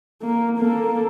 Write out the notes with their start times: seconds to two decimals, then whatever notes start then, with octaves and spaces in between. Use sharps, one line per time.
0.22 A#3
0.58 A#3 A4